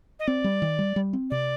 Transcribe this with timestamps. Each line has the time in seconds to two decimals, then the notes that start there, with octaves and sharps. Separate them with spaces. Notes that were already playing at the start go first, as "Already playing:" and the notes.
0.19 D#5
0.27 C4 D5
0.44 G3
0.62 D#3
0.79 G3
0.96 G3
1.13 C4
1.30 C3 D5